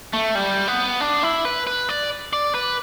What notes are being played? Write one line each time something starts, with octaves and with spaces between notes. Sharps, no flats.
A3
G3
B3
D4
E4
B4
B4
D5
D5
B4